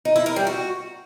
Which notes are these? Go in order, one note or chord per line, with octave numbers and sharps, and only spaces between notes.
D#4
E4
A#4
G3
F#4